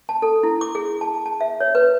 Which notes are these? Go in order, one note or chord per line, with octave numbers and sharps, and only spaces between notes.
A5
A4
E4
D6
G#4
A5
A5
E5
C#5
B4